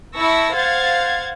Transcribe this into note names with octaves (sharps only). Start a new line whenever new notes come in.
E4 A5 C#6 E6 A#6
C5 F5 F#5 G#6 A6